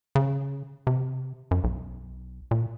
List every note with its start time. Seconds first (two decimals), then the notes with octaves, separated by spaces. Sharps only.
0.15 C#3
0.87 C3
1.51 F#2
1.64 B1
2.51 A#2